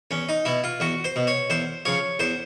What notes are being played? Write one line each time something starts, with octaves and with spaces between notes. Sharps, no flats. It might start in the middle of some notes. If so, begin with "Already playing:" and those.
E2 C#4
D#4
B2 E4
F4
E2 F#4
C5
B2
C#5
E2 C5
C#3 F3 C#5
E2 C5